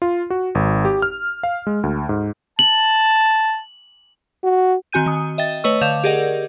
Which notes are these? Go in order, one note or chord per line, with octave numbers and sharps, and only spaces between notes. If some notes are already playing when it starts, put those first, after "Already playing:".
F4
F#4
G#1
G4
F6
F5
G#3
D2
G#2
A5 F#7
F#4
D#3 C4 F#4 G#5 G6 D#7
D#3 D#6
D#5 E5 G5 A6
A3 B4 C#5 D#5 C#6 E6
D3 F5 D6 G6 E7 F7
G4 G#4 A#4 D5 D#5 F#5